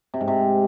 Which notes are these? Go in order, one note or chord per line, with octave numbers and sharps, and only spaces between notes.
C3
G#2
C3